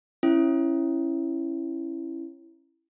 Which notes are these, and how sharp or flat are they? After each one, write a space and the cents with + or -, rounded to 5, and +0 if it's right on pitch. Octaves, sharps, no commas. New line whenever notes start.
C#4 -20 E4 +10